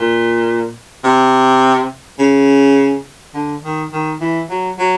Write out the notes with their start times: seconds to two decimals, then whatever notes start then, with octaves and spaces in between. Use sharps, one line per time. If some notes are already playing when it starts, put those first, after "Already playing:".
Already playing: A#2
1.04 C3
2.19 C#3
3.34 D3
3.63 D#3
3.92 D#3
4.20 E3
4.49 F#3
4.79 F#3